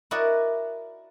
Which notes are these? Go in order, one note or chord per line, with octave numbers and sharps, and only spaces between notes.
E4 F#4 A#4 D5 D#5 F#5